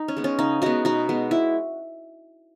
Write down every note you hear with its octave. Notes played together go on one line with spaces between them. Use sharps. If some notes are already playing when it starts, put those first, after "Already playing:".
Already playing: D#4
C#4
G#3 B3
C#4
C#3 D#4
G#3 B3 D#4 F#4
B2 D#4 F#4
G#3 B3
E4